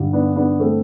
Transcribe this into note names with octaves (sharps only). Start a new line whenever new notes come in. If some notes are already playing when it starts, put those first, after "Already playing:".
Already playing: G2 D3
B3 D4
B3 D4
A3 C4